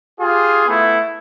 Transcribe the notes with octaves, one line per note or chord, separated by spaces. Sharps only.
F4 G4 G#4
A3 B3 E4